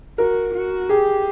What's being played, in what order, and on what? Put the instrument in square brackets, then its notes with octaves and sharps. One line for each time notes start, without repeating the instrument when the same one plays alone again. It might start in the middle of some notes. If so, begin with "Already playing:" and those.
[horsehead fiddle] F#4 [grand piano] A#4
[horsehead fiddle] F#4
[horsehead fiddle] G4 [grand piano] G#4